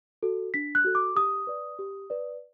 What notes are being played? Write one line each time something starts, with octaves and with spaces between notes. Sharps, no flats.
F#4 A4
D4 B6
F#6
F#4 A4
D6
G4 D#6
B4 D5
G4
B4 D5